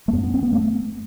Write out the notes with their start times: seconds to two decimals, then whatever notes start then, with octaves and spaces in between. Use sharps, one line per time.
0.08 A3
0.13 F#2 B3
0.23 B3
0.34 C4
0.43 B3
0.53 A3